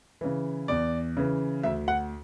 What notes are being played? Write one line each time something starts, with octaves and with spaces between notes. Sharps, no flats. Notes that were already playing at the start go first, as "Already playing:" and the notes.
C#3 E3
E2 D5
C#3 E3
D2 E5
F#5